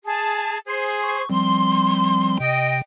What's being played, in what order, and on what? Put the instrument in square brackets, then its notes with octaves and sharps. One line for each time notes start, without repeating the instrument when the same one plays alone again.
[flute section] G#4 A5
G#4 C5
[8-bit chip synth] C#6
[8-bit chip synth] F3 G3 C4 [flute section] C6
[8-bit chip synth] C3 [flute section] D#5 G5